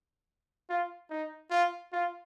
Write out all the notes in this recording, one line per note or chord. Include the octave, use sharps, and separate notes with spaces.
F4
D#4
F4
F4